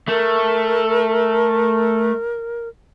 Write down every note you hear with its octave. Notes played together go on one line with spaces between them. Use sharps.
A3 A#4